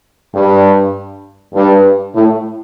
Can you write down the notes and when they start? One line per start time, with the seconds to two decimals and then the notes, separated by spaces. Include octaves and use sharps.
0.34 G2
1.54 G2
2.14 A2